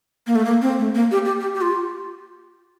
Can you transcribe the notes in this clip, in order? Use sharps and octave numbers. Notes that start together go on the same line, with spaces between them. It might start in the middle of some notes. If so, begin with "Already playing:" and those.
A#3
A3
A#3
C4
A3
A#3
G4
G4
G4
G4
F4